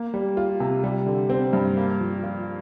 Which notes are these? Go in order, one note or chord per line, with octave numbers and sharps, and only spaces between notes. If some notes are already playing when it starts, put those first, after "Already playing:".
Already playing: A#3
G3
F4
C3
G3
D3
C4
G2
A#3
F3
F4